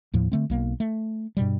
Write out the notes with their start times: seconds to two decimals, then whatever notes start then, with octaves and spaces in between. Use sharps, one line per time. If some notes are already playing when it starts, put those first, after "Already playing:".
0.14 D#2 A2 F3
0.32 D3 A3 C4
0.50 B1 A#3
0.80 A3
1.37 G2 B2 G3